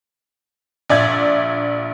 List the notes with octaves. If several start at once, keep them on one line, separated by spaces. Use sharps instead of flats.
A#1 D5 E5 G#6